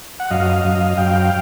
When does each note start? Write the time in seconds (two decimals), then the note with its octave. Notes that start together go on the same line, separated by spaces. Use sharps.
0.20 F#5
0.30 F#2 D#5 F5
0.64 F#2
0.97 F#2 F5 G5